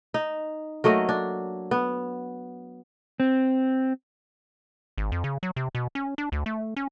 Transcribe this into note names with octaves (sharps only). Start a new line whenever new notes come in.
D#4
F#3 A3 A#3 D#5
D4
B3
C4
G#1
F2
C#3
F#3
C3
B2
C#4
D4
D2
A3
C#4